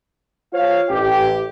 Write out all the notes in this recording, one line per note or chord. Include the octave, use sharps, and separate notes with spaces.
F4 C5 C#5 F5
A1 G4